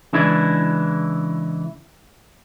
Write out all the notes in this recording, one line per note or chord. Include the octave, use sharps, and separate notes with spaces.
C#3 E3 G#3 D4 E4